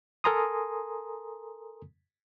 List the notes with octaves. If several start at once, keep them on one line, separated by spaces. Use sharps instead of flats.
A4 A#4 G#5 A#5 C6 D#6